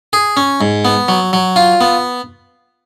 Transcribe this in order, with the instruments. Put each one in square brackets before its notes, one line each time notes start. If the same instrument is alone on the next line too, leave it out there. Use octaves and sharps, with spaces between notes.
[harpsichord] G#4
C#4
G#2
B3
F#3
F#3
F4
B3